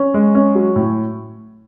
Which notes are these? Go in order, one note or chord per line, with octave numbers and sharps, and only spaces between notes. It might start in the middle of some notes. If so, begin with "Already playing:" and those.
Already playing: C#4
G#3
C#4
F#3
A2